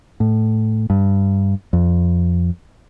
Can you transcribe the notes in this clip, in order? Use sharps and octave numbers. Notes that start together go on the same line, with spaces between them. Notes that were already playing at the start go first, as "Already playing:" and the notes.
A2
G2
F2